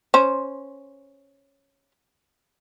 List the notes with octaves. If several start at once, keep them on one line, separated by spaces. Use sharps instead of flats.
C#4 C5